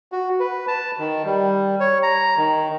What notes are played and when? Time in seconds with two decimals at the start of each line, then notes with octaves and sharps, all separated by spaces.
0.12 F#4
0.40 B4
0.68 A5
0.99 D#3
1.25 G3
1.80 C#5
2.03 A#5
2.37 D#3